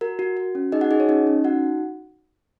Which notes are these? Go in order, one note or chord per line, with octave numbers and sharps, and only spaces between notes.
F#4 A#4
F#4
F#4
C#4
D#4 G#4 D#5
F#4 F#5
D#4 G#4 D#5
C#5
C#4 D#4 D#5
C#4
D#4 F#4 F#5